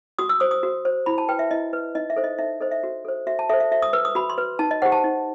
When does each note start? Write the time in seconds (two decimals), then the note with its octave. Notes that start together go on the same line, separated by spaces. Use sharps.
0.19 F#4 D#6
0.29 E6
0.40 C5 D#6
0.51 D#6
0.63 F#4
0.85 C5
1.06 E4 B5
1.18 A5
1.29 B4 G5
1.39 E5
1.51 E4 D#5
1.73 B4
1.95 D#4 D#5
2.10 E5
2.16 A4 C5
2.24 D#5
2.38 D#4 E5
2.60 A4 C5 D#5
2.72 E5
2.84 F#4
3.05 A4 C5
3.27 F#4 E5
3.39 A5
3.49 A4 C5 E5
3.60 E5
3.72 F#4 E5
3.82 D#6
3.93 B4 E6
4.05 D#6
4.15 F#4 B5
4.30 C6
4.38 B4
4.59 D#4 A5
4.71 D#5
4.82 G4 C5 F#5
4.92 A5
5.04 D#4